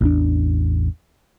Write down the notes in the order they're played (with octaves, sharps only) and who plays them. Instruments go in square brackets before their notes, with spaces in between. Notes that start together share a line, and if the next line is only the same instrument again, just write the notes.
[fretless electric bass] A1 E2 D4